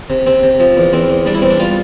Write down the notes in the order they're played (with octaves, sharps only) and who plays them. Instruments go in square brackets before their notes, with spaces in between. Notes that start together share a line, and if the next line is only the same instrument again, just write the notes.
[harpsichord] C3
C3 C4
C3
F3
E2
E2 C4
E2
G3 D4
E4
E2 C4
D4
G3 F4